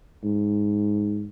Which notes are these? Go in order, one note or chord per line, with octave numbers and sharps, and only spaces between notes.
G#2